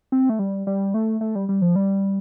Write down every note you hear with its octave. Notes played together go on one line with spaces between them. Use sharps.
C4
A3
G3
G3
A3
A3
G3
G3
F3
G3